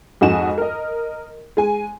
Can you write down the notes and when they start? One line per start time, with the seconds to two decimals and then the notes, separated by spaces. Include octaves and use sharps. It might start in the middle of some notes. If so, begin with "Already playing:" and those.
0.21 F2 G#2 F#4 D#5 G#5 E7
0.58 A#4 D#5
1.57 G#3 G#5